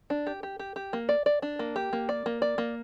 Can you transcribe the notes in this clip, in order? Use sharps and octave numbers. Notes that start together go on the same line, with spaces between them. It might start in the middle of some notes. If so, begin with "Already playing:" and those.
D4
G4
G4
G4
G4
A#3
D5
D5
D4
A#3
G4
A#3
D5
A#3
D5
A#3